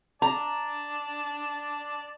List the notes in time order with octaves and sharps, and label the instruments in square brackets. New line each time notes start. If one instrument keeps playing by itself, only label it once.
[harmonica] D5 A5 [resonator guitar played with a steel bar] A#5